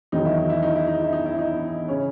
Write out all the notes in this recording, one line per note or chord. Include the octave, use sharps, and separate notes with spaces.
E2 D#3 F#3 D#4
E4
D#4
E4
D#4
E4
D#4
E4
D#4
E4
D#4
C#3 C#4